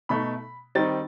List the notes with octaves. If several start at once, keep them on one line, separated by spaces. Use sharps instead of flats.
B2 A3 D#4 B5
D#3 G3 C4 D#4 A6